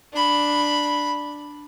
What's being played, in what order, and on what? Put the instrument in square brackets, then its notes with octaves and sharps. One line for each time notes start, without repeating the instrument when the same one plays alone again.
[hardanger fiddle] D4 B5